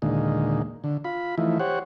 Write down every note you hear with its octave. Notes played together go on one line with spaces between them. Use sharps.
D#2 A#2 D3 G#3 D#4
D3
F4 B5
E3 F3 A3 D#4 E4
G4 C5 C#5 F#5